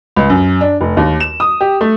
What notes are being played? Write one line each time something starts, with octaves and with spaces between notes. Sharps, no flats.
C#2
F#2
D4
F1
D#2
E7
D#6
G4
A3